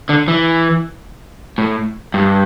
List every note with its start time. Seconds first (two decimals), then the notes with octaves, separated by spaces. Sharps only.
0.09 D3
0.28 E3
1.58 A2
2.14 G2